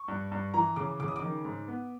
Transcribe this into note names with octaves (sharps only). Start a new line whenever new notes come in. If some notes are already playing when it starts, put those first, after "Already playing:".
Already playing: C#6
G2
G2
E3 A#5
C#3 D6
C#3 D6
D#6
D6
D#3
G#2
B3